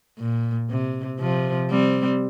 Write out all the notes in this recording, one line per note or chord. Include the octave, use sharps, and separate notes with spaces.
A#2
C3
C3 F3
G3 C4